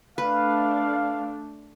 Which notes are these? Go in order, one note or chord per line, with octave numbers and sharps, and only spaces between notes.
A3 D4 B4 F5